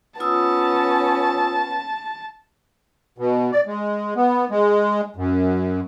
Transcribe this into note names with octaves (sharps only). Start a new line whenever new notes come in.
B3 C#4 F4 A5 D#6 E6
B2
D5
G#3
B3
G#3
F#2